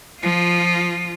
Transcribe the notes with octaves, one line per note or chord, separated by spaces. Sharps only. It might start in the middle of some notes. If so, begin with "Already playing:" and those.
F3 F4